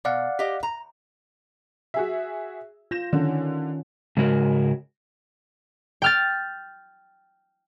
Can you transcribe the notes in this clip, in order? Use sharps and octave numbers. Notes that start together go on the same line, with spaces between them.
B2 D5 F5 F#5
G4 D#5
A#5
F#4 G#4 E5
F4 G6 A#6 E7
D3 D#3 C#4
G#2 C#3 G#3 F#4 A#4
G5 F6 A6